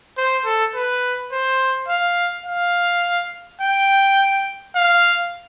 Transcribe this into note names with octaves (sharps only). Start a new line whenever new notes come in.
C5
A4
B4
C5
F5
F5
G5
F5